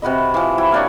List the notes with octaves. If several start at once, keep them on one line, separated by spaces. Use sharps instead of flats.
C3 F#4 B4 D#5
E3 F3
E4 F#4 G5
A#3 D4 C#5